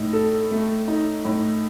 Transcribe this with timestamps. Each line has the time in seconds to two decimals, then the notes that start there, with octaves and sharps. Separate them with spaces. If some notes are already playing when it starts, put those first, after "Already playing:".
Already playing: A2 D#4
0.13 A4
0.51 A3
0.88 D#4
1.25 A2